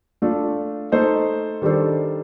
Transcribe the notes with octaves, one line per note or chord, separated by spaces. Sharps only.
A3 D4 F4 A4
A3 D#4 A4 C5
D#3 G3 D4 A4 C5